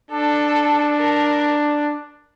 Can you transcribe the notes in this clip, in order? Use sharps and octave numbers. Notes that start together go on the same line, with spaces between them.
D4 A4
A#4